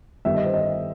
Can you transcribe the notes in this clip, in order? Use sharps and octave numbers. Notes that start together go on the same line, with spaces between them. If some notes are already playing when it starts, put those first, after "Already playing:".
G1 G2 D#3 G3 B3 E5
D#5
C5
D#5